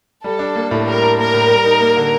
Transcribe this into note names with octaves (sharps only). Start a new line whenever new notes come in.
G3 A4
D4
A#3
A2
G3 A#4
D4
A#3 A#4
A2
G3
D#4
A#3
D3